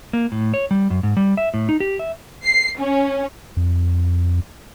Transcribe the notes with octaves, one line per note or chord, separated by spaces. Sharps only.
A#3
A2
C#5
G3
F#2
G#2
G3
E5
A2
D#4
G4
E5
C7
C#4
F2